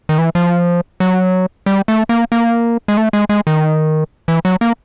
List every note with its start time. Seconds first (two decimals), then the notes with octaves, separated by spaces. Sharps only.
0.09 D#3
0.18 E3
0.35 F3
1.00 F#3
1.66 G3
1.88 A3
2.09 A#3
2.32 A#3
2.88 G#3
2.97 A3
3.13 G#3
3.29 G#3
3.47 D#3
4.28 E3
4.45 F#3
4.61 A#3